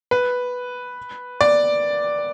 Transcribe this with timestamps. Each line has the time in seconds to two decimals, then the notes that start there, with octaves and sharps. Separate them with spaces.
0.11 B4
1.41 D5